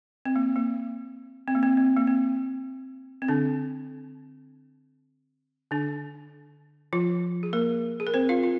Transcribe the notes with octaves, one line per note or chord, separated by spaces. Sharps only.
C4
A#3
A#3
C4
A#3
C4
C4
A#3
C4
C4
D3 D4
D3 D4
F3 F4
G#4
A#3 A#4
G#4
A#4
C4 C5
F4 F5
F4